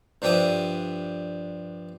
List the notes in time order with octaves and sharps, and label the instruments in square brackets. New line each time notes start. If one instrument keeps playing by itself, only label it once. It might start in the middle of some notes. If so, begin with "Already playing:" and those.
[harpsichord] G2 F3 D4 G4 E5 D#6